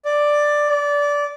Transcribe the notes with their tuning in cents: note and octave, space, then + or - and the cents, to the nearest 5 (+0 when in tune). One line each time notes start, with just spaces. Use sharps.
D5 +5
D5 -20